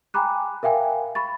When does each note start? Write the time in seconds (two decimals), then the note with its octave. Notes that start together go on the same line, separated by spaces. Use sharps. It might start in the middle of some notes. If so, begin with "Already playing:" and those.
0.14 G5 G#5 A#5 B5 D6 F#6
0.63 A#4 E5 F5 G5 G#5
1.15 B5 C#6 A6